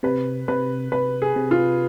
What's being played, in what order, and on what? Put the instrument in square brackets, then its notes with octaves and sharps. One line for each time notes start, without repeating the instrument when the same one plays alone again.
[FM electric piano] C3 [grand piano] B4
[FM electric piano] C3 [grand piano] B4
[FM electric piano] C3 [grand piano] B4
[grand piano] G#4
[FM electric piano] C3
[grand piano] F4